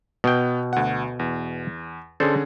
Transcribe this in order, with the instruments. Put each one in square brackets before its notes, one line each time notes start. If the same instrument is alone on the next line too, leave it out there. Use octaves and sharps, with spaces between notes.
[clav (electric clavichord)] B2 G5 [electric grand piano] B3
[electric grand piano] D2 F#5
E2
[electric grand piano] D3 C#4 G#4 [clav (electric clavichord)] A4 C5 D5